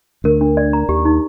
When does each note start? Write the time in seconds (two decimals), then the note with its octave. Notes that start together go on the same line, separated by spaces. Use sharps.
0.24 D2 D3 A#4
0.41 D4
0.57 D5
0.73 A#5
0.89 D#2 D#3 G4
1.05 D#4